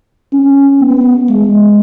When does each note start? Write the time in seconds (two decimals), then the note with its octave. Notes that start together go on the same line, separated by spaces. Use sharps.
0.33 C#4
0.81 B3
1.30 G#3